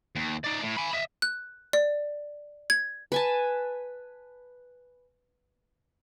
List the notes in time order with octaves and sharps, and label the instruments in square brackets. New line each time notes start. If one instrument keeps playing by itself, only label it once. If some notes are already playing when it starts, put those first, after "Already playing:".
[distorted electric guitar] D#2
D#4 D5
A2
G#5 B5
D#5 E5
[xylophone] F#6
D5
G#6
[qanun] B4 G#5 A5